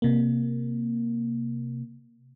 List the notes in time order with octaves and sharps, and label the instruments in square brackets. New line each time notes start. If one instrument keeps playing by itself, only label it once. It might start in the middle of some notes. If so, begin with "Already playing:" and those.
[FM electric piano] C3 A#3